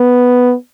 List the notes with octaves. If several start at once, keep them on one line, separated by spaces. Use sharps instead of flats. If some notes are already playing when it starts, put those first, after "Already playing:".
Already playing: B3